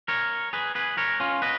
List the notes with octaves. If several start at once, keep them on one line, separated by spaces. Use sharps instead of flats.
A#4 C#5
G#4 B4
G#4 B4
A#4 C#5
C#4 F4
B4 D#5